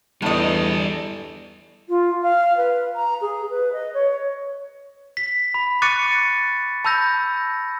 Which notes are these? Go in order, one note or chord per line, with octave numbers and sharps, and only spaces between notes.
E2 A2 G3 D4 A4 D#5
F4
F5
B4
A#5
G#4
B4
D#5
C#5
B6
B5
C#6 D6 F#6 A6 C#7 D#7
A5 B5 E6 G6 A#6